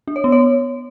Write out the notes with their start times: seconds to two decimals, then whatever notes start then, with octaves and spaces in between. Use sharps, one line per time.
0.08 D4
0.16 C#5
0.24 B3
0.32 C#5